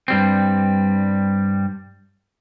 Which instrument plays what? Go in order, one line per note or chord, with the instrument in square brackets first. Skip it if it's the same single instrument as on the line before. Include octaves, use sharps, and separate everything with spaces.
[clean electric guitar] G2 G3 C4